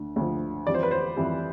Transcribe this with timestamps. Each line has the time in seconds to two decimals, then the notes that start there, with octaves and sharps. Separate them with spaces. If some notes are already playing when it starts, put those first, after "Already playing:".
Already playing: D2 D3
0.16 D2 D3 F3
0.67 F2 E3 G3 D5
0.74 C5
0.83 B4
0.91 C5
1.17 F2 E3 G3